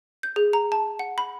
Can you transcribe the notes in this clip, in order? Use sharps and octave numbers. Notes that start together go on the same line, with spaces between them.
G6
G#4
A#5
A5
F#5
B5